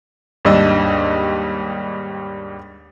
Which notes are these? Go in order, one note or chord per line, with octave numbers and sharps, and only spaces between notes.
D#2 G#2 G3 D4 D#5 E6